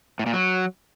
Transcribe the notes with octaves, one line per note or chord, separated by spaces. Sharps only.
A2
A#2
F#3